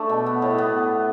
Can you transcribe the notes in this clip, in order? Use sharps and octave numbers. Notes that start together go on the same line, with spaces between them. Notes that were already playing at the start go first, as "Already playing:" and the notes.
Already playing: A3 D4 A4 D5 E5
B2
B3
A2
B3